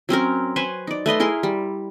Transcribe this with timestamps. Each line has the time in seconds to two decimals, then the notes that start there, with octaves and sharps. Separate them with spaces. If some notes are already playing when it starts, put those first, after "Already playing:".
0.09 F#3 C4 C#4 A#4
0.56 B4 C5 G#5 C#6
0.87 D#4 D5
1.06 A3 B4 D#5 C6
1.20 E4 G#4 A#4 C6
1.43 G3